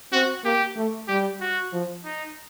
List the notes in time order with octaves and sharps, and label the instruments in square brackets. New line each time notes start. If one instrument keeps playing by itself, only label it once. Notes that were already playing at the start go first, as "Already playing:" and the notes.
[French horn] C4 [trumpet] F#4
[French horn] A#3 [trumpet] G4
[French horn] A3
[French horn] G3 [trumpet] G4
[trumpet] F#4
[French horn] F3
[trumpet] D#4